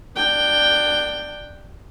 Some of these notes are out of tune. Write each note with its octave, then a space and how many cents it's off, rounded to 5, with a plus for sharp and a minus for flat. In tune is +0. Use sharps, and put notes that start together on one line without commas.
D4 +15 G5 +0